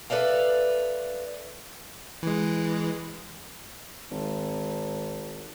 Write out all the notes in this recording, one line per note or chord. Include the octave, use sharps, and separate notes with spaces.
A4 B4 D5 E5 F5
E3 G#3
G#1